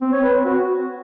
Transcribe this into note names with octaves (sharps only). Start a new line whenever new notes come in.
C4
C#5
B4
C4
F#4